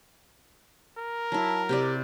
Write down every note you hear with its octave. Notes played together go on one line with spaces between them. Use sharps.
A#4
F#3 E4 A5
C3 E4 G4 D5